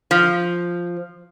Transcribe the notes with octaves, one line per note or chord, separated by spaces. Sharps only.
F3